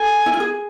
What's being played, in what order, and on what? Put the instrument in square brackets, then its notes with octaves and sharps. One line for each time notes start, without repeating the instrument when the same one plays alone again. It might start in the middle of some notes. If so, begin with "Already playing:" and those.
Already playing: [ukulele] A4 [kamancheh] G#5
[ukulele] E4
F4
G#4